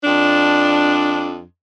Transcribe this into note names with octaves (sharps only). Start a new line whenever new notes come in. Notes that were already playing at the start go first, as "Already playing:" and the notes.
F2 D4